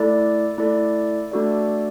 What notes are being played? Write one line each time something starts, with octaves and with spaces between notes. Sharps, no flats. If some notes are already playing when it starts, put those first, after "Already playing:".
Already playing: A3 E4 A4 D5
A3 E4 A4 D5
A3 D4 F#4 A4 D5